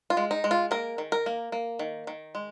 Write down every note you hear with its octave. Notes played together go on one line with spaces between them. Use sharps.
F4
G#3
D#4
G#3
F4
A#3 A#4
D#3
A#4
A#3
A#3
D#3
D#3
G#3